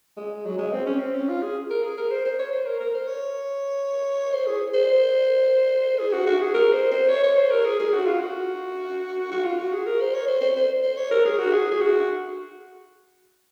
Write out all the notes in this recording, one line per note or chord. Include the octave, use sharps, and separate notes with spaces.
G#3
F#3
G#3
C4
C#4
C4
C#4
F4
G#4
A#4
G#4
A#4
C5
C5
C#5
C5
A#4
A#4
C5
C#5
C5
G#4
C5
G#4
F#4
F#4
G#4
A#4
C5
C5
C#5
C#5
C5
A#4
G#4
G#4
F#4
F4
F#4
F#4
F4
F#4
G#4
A#4
C5
C#5
C5
C5
C5
C5
C#5
A#4
G#4
F#4
G#4
G#4
F#4